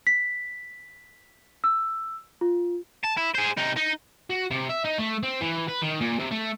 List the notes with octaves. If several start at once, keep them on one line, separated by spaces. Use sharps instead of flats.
B6
E6
F4
A5
E4
G#4 C5
C3 D#4
D#4
F#4
C3
E5
D#4
A3
C4
E3
B4
D#3
A#2
C3
A3